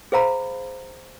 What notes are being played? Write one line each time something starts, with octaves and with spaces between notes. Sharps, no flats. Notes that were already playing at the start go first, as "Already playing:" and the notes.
G#4 C5 F5 A#5 B5